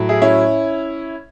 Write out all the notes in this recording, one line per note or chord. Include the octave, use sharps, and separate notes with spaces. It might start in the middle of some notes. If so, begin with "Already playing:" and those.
Already playing: A2 F#3
E4 G#4
C#4 E4